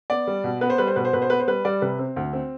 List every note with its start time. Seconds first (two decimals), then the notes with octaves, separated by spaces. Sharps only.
0.10 B3 D5
0.27 G3
0.44 B2
0.61 B3 B4
0.70 C5
0.78 G3 B4
0.87 C5
0.96 B2 B4
1.05 C5
1.13 B2 B4
1.22 C5
1.30 B3 B4
1.40 C5
1.48 G3 B4
1.65 G3 D5
1.82 C3 B4
1.99 C4
2.16 D2
2.33 C4